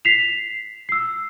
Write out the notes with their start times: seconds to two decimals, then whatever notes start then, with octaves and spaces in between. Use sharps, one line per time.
0.05 B6 C7 E7 F7
0.89 E6 C7